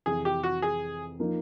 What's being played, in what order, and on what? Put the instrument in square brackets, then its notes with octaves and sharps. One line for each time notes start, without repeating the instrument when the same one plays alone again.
[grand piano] F2 C3 E3 [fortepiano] G#4
[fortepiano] G4
F#4
G#4
[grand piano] F3 A#3 D#4